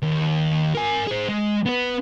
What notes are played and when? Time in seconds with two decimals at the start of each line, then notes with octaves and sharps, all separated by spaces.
0.03 D#2
0.75 A#4 G#5
1.07 G#4 C5
1.29 G#3
1.66 B3 B4